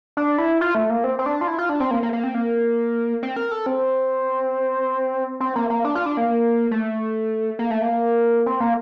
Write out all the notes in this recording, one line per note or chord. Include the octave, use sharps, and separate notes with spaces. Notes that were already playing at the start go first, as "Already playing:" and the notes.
D4
E4
F4
A3
A#3
C4
C4
D4
F4
E4
F4
D4
C4
A#3
A#3
A#3
C4
A#3
C4
A#4
A4
C4
C4
A#3
A#3
D4
F4
D4
A#3
A3
A#3
A3
A#3
C4
A#3